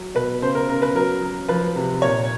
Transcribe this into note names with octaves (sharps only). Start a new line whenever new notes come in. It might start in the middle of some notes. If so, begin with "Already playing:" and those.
Already playing: F#3
B2 B4
C#3 C5
A#4
C#3 A#4
B4
F#3 A#4
F#3
F3 B4
C3
A#2 C#5